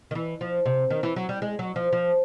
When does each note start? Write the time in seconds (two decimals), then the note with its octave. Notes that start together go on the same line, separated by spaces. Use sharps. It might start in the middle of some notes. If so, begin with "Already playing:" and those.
0.11 D#3
0.15 E3
0.41 F3
0.66 C3
0.90 D#3
1.03 E3
1.16 F#3
1.29 G3
1.42 G#3
1.59 F#3
1.76 F3
1.93 F3